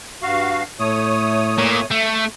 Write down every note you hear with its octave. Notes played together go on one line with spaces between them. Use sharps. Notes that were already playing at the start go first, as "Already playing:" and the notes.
G2 F#4 F5
A2 A3 C#5 D#6
A#2
A3